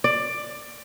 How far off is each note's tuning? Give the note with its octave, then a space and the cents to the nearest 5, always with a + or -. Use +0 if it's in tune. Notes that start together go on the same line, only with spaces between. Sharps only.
D5 +15